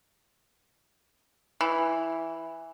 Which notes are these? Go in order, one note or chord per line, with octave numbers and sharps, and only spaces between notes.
E3